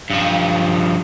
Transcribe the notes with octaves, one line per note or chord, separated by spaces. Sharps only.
G2 F3